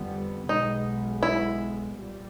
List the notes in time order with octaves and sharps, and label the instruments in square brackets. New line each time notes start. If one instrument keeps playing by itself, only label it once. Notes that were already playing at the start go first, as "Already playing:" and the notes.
Already playing: [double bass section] F2 D3 G3 B3
[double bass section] B1 B2 G#3 B3 [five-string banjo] D#4
[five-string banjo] E4
[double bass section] A#1 A#2 G3